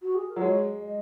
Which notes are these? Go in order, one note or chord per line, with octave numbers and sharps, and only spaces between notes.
F#4
G#4
A#4
F#3
G#3 C#5
D#5